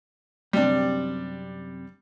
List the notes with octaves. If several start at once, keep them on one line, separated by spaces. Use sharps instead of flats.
F#2 C3 G3 D4